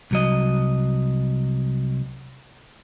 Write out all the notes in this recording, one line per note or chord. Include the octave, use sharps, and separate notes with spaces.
C2 F#3 D#5